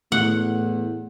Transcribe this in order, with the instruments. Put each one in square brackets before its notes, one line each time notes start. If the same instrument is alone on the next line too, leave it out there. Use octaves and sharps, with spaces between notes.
[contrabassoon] E2 [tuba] A2 [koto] F#5